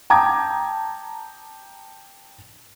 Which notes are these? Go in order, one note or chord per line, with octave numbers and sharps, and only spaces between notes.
G5 A5 A#5 D6 D#6 G#6